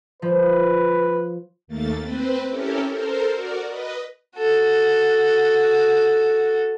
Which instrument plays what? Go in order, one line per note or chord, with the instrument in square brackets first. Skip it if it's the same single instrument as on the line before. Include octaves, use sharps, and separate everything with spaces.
[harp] F3 [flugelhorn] B4
[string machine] D#2 A3 A#3 A6
C4 B4 C5
C#4 E4 G4 A4 A#4
A4 A#4 C5
F#4 A#4 D5
B4 D#5
[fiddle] F#4 A4